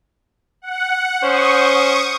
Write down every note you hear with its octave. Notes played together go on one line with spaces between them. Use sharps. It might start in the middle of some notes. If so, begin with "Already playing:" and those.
F#5
C#4 C5 C#6 D#6